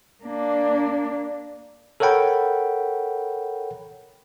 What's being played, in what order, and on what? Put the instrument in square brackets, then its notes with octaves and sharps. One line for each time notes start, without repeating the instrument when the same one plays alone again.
[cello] A#3 D4
[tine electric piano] A4 A#4 C#5 F#5 G5 B5